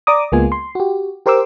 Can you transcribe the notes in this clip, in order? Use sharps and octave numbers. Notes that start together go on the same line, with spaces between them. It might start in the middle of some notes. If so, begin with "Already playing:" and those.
D5 A#5 D6 D#6
C#2 G#3 A#3 B3 F4 G#5
C6
F#4 G4
G4 A#4 C5 C6 D6 E6